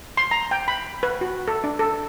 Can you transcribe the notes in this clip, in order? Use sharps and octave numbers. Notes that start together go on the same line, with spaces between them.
C6
A#5
G5
B5
B4
F#4
A4
D4
A4